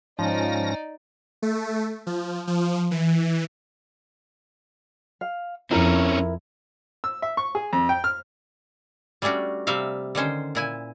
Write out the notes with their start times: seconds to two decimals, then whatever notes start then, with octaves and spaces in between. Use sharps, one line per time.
0.19 G#2 F3 C#4 D#4 D5 A#6
1.42 A3
2.07 F3
2.47 F3
2.91 E3
5.21 F5
5.71 F2 C4 C#4 E4 A#4
7.04 E6
7.22 E5
7.37 C#6
7.55 G#4
7.73 F2
7.89 G5
8.04 F6
9.22 G3 A3 C#4 D4 F#4
9.67 C3 G3 C4 E5 F5
10.15 D3 D#3 C#4 C5
10.55 A#2 E4 G#5